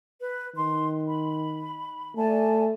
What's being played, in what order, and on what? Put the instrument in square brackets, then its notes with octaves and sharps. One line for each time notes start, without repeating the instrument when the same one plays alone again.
[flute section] B4
[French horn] D#3 [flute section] C6
[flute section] B5
[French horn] A3 [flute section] D5 G#5 A5